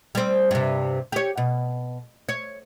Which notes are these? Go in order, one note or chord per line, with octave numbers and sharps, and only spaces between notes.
G3 C4
G2 C3
G4 C#5
B2
C#5